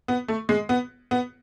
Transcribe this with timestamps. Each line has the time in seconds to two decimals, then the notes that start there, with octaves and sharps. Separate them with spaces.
0.08 B3
0.28 A3
0.49 G#3
0.69 B3
1.11 B3